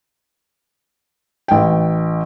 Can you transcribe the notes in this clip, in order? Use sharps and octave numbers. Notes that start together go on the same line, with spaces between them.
A1 G5